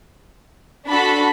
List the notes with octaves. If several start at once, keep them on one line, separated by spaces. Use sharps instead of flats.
D4 F#4 A4 B5